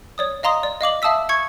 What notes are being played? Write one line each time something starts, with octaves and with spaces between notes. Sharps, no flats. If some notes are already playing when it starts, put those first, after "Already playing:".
C#5 D5 D#6
D#5 F5 A#5 C6 D#6
D5
D#5 F5 D6 F#7
E5 F5 A5 D#6 E6 B6
C#6 G#6 C#7